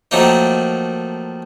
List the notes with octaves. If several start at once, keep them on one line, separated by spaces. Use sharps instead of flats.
D#3 F3 F#3 A3 A#3 D#4